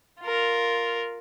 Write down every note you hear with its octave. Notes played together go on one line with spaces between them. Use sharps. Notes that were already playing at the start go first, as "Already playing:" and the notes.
F4 A#4